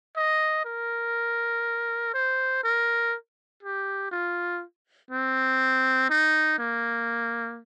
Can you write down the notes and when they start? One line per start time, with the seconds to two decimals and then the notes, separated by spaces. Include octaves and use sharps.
0.17 D#5
0.65 A#4
2.14 C5
2.64 A#4
3.63 G4
4.11 F4
5.11 C4
6.10 D#4
6.59 A#3